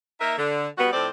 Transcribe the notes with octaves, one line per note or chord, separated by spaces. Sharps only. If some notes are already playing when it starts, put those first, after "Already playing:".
A#3 D#4 A#4 E5
D3
G3 B3 F#4
A2 F3 C4 A4 C5 D5